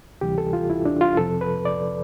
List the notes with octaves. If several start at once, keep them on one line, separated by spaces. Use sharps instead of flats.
D2 C3 E3 G3 G4
A4
F4
E4
D4
F4
F2 C3 F3 A4
B4
D5